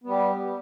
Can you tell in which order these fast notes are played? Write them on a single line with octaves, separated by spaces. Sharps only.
B3 G3 G4